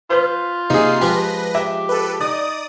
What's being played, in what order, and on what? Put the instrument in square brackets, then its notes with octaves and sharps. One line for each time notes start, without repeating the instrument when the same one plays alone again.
[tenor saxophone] F4 [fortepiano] B4 C5
[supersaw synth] C3 C7 [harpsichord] A#3 [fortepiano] D#4 G#4
[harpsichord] F3 G#3 C6 [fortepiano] G4 [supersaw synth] B4 A#6
[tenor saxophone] G4 [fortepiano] E5
[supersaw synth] A4 B4
[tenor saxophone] D#4 [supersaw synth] D5 D#6